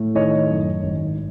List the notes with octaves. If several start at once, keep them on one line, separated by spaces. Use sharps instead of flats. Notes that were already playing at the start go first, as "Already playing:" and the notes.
Already playing: A2 A3
D#3 C#5 D#5
F#2
G#1